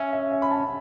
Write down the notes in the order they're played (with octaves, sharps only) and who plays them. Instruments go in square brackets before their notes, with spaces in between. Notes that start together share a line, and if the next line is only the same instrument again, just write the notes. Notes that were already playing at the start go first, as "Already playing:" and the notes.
Already playing: [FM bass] C#4 [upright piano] E5
[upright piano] E5
E5
B5
A5